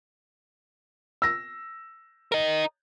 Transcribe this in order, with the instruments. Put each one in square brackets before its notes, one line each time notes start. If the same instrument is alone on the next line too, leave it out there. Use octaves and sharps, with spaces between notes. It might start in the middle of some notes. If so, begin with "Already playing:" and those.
[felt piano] E6 A#6
[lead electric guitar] A#4 D#5